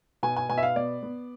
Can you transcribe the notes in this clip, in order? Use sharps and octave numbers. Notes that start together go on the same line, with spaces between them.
B2 G#5
G#5
B2 G#5
E5
F5
B3 D5
B3